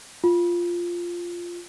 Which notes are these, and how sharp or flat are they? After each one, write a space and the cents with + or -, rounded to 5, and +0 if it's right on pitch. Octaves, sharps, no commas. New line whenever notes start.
F4 -5